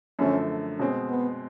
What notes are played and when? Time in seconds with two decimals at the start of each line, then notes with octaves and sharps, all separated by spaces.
0.19 F#2 D3 F3 A3 C#4
0.79 B2 G#3 C4 C#4
1.10 B3